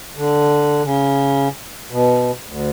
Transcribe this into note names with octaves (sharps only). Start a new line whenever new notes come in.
D3
C#3
B2
D2